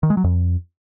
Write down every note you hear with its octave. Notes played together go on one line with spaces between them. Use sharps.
D#3
G#3
F#3
F2